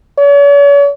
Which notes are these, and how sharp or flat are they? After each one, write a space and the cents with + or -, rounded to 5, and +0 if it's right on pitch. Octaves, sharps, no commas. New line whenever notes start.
C#5 +45